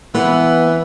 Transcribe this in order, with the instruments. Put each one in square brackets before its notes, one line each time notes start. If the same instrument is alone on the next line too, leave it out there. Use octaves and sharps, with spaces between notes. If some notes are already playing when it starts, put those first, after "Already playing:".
[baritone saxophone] E3 [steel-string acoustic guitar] B3